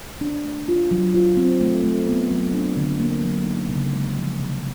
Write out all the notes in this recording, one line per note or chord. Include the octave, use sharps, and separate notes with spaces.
D4
A3
F4
F#3
F4
C4
A3
A3
B3
F#3
D4
D3
A#3
F#3
D#4
C#3
G#3
F3
C3